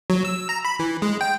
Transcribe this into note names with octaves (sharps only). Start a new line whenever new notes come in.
F#3
E6
A#5
B5
E3
G#3
G5